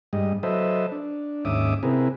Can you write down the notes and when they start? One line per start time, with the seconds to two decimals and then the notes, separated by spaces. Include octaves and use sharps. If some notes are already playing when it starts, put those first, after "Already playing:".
0.13 G2 G3 G#3 D#5
0.43 F#3 A4 B4 C5 D#5 E5
0.92 D4
1.45 D#2 G#2 C#4 E5 D6 D#6
1.83 C3 C4 E4 G#4 A#4 B4